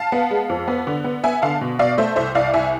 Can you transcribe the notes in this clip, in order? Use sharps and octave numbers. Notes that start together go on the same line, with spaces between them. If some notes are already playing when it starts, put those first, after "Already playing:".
Already playing: F5 A5
B3
G#3
F2
B3
D3
B3
B3 E5 G#5
D3 F5 A5
B2
B2 D5 F5
A3 C5 E5
C2 C5 E5
C2 D5 F5
C2 E5 G#5